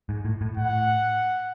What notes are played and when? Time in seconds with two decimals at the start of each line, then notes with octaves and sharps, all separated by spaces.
0.09 G#2
0.25 A2
0.41 A2
0.57 A2 F#5